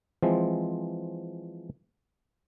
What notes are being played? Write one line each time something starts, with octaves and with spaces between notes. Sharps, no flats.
E3 F3 G#3 C4